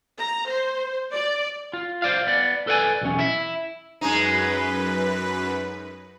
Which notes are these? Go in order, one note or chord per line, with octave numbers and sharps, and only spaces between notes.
A#5
C5
D5
F4
C5 D5 F5
B3 D5
A4 B4 D5 F#5 G#5
B1 E2 C#4
E4 E5
F#2 G#3 C#4 D#4 B4